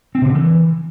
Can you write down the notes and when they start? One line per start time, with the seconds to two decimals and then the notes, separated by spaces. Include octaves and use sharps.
0.15 C4
0.22 C3
0.28 D3
0.35 E3